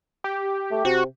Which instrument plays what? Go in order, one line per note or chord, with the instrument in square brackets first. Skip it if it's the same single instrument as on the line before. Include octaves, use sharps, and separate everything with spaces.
[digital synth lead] G4
[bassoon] A3
[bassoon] C3 [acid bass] F#4